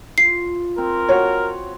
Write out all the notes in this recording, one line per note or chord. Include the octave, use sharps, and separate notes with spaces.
F4 C7
C4 A#4
F#4 C#5